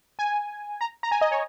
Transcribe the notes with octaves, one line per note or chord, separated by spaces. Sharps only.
G#5
A#5
A#5
G#5
D#5
C#5